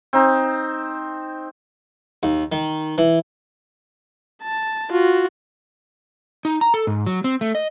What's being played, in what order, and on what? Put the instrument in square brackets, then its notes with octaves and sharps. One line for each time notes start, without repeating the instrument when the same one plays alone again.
[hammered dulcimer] C4 D#4
[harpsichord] D#2
D#3
E3
[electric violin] A5
F4 F#4
[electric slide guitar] D#4
A#5
A4
G#2
F#3
C4
A3
D#5